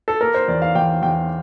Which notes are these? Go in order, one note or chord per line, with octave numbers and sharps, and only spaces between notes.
A4
A#3 A#4
C5
E2 D5
F5
E2 G5
E2 G5